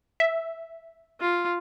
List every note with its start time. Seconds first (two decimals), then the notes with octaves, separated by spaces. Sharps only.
0.20 E5
1.21 F4